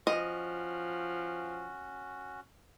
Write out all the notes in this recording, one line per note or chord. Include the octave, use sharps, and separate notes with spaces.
F3 C#4 F#4 D#5